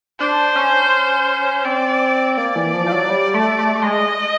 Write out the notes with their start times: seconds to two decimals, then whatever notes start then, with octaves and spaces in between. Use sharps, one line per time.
0.19 D4 C5
0.56 C#4
1.65 C4 D5
2.37 A#3 D5
2.56 E3
2.74 F3
2.86 F3
2.92 F#3
3.10 G3
3.34 A3
3.58 A3
3.75 A3
3.82 G#3 D#5